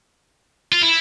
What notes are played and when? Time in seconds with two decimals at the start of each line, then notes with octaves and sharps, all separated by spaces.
0.73 F4
0.82 E4